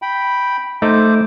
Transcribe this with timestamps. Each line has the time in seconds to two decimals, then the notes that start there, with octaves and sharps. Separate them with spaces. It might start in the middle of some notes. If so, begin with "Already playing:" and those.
0.02 G5 B5
0.82 A3 D#4 C5 D6